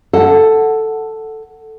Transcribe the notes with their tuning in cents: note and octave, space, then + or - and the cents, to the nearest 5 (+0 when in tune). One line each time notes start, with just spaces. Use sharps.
A4 +0 F#5 +0